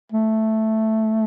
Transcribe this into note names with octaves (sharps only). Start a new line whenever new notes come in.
A3